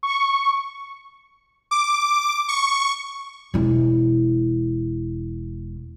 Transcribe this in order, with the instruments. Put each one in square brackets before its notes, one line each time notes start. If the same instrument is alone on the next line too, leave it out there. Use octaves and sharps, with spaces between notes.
[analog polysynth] C#6
[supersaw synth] D6
C#6
[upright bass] E1 E4